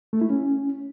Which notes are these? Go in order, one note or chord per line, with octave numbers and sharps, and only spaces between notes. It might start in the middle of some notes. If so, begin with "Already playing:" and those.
A3
E4
C#4